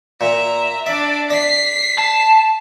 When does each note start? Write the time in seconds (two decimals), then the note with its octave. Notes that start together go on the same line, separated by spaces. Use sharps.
0.21 A#2 E5 A#5
0.86 D4 D5 E5
1.30 D5 B6 C7
1.98 A5